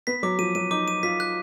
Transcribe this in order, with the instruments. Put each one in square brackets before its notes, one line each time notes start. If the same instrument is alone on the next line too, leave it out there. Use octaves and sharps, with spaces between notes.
[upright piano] B3 [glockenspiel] B6
[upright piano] F#3 [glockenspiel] D6
[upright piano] F3 [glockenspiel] D#7
[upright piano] F#3 [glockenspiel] D#7
[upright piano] D#4 [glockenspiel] D6
[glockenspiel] D#7
[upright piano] F4 [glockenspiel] B6
[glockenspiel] F#6